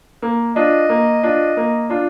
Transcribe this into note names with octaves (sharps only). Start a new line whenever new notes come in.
A#3
D4 F4 D#5
A#3
D4 F4
A#3
D4 F4